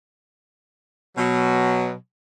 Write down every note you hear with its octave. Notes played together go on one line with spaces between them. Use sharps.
B2 F#3